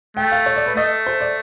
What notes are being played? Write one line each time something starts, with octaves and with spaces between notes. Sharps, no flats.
A3 G5
F5
C#5
D5
B4
A3 D#5
C5
D5